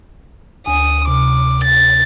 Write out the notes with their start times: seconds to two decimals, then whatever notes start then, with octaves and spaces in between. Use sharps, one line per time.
0.66 D2 G#5 D#6
1.08 C3 D6
1.64 A6